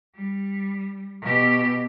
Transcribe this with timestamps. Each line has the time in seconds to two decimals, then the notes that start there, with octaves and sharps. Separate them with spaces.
0.15 G3
1.22 B2 G4